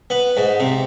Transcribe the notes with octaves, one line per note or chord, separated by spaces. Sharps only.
B3
G#2
C3